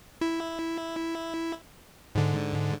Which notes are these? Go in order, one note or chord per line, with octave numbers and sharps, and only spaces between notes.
E4
G#2 D3